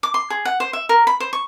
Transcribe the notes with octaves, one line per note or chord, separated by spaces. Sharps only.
D6
C6
G#4
F#5
C5
E5
A#4
B5
C5
C#6